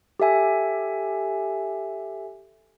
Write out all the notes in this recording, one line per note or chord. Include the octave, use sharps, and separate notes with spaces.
G4 A4 E5 G#5